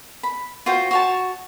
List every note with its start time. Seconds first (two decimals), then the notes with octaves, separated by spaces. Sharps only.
0.23 B5
0.66 F4 F#4 C5 G5
0.91 F#4 C#5 A5